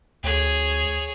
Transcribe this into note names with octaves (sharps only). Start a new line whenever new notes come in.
D2 G#4 C#5